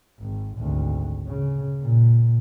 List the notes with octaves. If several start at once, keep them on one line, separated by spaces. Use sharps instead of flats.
G#1
G#1 D2
C#3
A#2